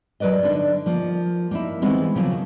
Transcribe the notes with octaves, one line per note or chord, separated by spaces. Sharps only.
F#3 A#4 B4 D5 D#5
D3 D4 D#4
F3 A#3
A#3 D#4 E4
D#3 E3 G#3 B3 C4
C#3 F3 F#3 A#3